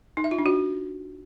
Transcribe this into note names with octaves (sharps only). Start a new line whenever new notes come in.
D#4
E5
F4
D4
F#4